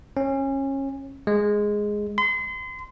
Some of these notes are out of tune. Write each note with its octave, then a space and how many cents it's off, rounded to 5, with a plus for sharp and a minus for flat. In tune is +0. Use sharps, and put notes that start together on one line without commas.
C#4 -25
G#3 +0
C6 -35